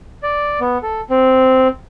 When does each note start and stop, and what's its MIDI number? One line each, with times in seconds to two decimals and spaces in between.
0.23 0.60 74
0.60 0.78 59
0.83 1.01 69
1.10 1.68 60